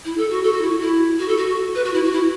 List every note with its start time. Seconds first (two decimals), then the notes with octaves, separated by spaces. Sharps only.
0.05 E4
0.18 A4
0.31 F#4
0.43 A4
0.52 F#4
0.62 E4
0.71 F#4
0.81 E4
1.19 F#4
1.28 A4
1.37 F#4
1.47 F#4
1.75 B4
1.84 F#4
1.94 E4
2.03 F#4
2.12 E4